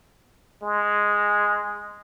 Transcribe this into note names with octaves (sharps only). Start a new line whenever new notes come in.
G#3